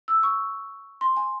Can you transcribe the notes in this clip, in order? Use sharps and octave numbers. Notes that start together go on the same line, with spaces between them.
E6
C#6
C6
G#5